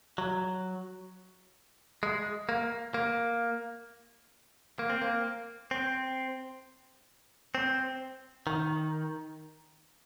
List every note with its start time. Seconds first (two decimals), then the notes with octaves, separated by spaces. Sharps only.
0.18 F#3
2.03 G#3
2.49 A#3
2.94 A#3
4.79 A#3
4.90 C4
5.02 A#3
5.71 C4
7.55 C4
8.47 D#3